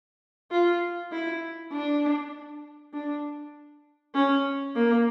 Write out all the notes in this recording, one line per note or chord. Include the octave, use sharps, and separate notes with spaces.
F4
E4
D4
D4
C#4
A#3